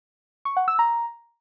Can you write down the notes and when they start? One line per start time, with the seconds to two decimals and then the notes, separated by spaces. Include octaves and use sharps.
0.45 C#6
0.57 F#5
0.68 E6
0.79 A#5